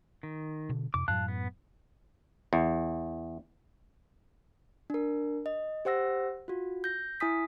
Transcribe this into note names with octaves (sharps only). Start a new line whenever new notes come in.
D#3
B2 D3
F2 C3 D6
F#2 A2 F#3 F5 A5 F#6
B3
E2
D4 A#4
D#5
G4 C5 F#5 E6 A#6
F4 F#4
G6 A#6
E4 G#5 D#6 B6